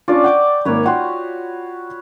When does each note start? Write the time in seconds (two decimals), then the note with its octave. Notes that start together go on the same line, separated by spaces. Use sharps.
0.08 C#4 D4 F4 D5 C#6
0.24 F#5 G5 D6
0.65 G#1 A#3 B4 C#5
0.86 F4 F#4 F#5 G5 C6